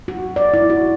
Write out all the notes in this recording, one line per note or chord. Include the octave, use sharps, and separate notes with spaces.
F#4
D5
E4
F#4